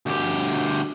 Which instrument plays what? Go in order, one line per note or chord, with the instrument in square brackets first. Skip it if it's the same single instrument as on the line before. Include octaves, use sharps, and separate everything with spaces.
[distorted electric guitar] D2 G4